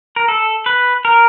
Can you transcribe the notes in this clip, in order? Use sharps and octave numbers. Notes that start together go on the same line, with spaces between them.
A#4
A4
B4
A#4